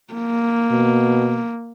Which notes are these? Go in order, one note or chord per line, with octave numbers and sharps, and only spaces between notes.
A#3
B2